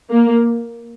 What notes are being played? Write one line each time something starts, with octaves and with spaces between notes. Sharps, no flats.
A#3